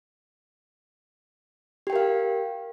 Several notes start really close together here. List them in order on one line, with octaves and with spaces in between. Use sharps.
G4 G5 A#4 F5